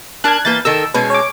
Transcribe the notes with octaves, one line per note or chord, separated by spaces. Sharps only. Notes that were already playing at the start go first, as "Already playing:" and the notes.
D4 A#4 A5 F#6 G#6
E3 A#3 B4 G6 A6
D#3 A4 A#4 E6
B2 G#3 C#4 B4
C#5 D6